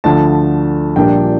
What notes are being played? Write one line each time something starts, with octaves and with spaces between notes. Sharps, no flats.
D2 D3 F3 A5
A#1 A#2 G3 A#3 D4 G5